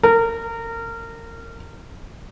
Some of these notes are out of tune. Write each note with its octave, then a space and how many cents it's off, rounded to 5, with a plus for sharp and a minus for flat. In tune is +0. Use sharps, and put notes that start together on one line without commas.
A#4 -25